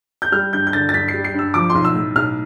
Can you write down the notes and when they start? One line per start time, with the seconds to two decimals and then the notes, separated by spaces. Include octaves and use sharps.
0.22 G6
0.32 G3 F6
0.53 G2 G6
0.67 G6
0.73 D3 A6
0.89 A6
0.94 G2 B6
1.08 C7
1.14 G3
1.24 C7
1.34 G2 E6
1.54 F3 D6
1.70 C6
1.75 B1
1.85 E6
1.96 A2
2.16 B1 F6